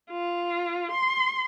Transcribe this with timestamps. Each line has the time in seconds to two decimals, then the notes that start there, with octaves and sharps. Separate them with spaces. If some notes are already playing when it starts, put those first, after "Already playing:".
0.11 F4
0.92 C6